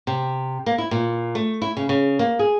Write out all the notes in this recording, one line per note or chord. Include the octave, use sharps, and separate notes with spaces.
C3
A#3
E4
A#2
A3
E4
C#3
C#3
A#3
G#4